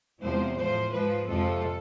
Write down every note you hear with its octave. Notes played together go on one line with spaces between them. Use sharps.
E2 C3 F3 G#3 C5
A2 F3 G#3 C5
G#2 F3 G#3 B4
F2 C3 F3 G#3 A4